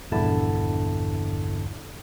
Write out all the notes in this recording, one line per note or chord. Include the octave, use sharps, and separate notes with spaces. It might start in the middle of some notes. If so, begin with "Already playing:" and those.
A#1 E2 G2 D3 E4 A5